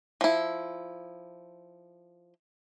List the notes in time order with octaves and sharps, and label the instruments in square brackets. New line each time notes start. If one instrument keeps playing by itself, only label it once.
[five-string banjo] F3 E4